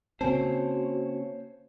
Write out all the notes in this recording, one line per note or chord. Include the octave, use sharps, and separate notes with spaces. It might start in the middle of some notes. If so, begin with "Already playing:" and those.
C#3 A#3 C4 F#4 C5 C#5 G#5 A5